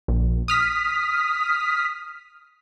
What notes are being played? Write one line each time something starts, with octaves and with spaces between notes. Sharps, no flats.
A#1
D#6 F6 B6